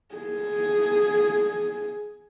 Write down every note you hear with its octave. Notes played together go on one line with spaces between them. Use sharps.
G#4